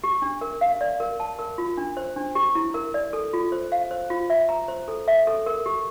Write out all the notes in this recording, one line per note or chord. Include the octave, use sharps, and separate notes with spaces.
G4
D4
A#4
F5
D5
A#4
A5
A#4
F4
D4
C5
D4
G4
E4
A#4
D5
A4
F4
C5
F5
C5
F4
E5
A#5
C5
A4
E5
A4
A#4
G4